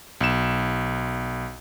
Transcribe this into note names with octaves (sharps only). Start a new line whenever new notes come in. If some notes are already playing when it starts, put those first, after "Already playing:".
B1 E7